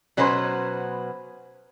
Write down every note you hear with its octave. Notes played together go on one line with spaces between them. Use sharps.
B2 F#3 B3 C#4 B4 C5